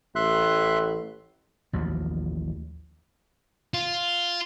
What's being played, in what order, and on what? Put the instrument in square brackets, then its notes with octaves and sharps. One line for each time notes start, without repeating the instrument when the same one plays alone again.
[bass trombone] A1 [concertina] E5 C6 F#6
[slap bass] A1 D#2 F3 F#3
[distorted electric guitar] F4